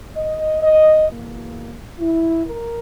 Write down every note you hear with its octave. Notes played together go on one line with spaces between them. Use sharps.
D#5
D#5
E2 B2 A#3
E4
A#4